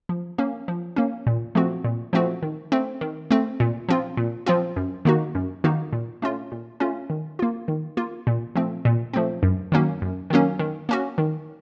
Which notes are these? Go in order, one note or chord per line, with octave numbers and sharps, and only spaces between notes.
F3
A#3 C#4
F3
A#3 C#4
A#2
F3 A3 C4 F#4
A#2
F3 A3 C4 F#4
D#3
A3 C4
D#3
A3 C4
A#2
F3 C4 F4
A#2
F3 C4 F4
F#2
D#3 A#3 D#4 F#4
F#2
D#3 A#3 D#4 F#4
A#2
A3 C#4 F4
A#2
A3 C#4 F4
D#3
A#3 F4
D#3
A#3 F4
A#2
F3 A3 C4
A#2
F3 A3 C4
F#2
D#3 F#3 A#3 C#4
F#2
D#3 F#3 A#3 C#4
D#3
A#3 C#4 F#4
D#3